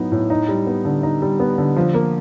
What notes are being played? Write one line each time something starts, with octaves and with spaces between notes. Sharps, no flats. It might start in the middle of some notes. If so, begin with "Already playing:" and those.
Already playing: A2 F#3 B3 D#4
A2
D#4
G3
B3
D3
D#4
G3
B3
D3
F3
A#3